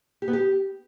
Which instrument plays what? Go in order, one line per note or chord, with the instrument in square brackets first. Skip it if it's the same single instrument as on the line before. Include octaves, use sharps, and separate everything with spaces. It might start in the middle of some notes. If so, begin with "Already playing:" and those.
[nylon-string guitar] G4
B3
G4